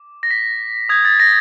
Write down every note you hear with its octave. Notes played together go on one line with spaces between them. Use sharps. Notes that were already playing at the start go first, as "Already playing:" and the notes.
Already playing: D6
A#6
B6
D#6 G6 G#6
A6
A#6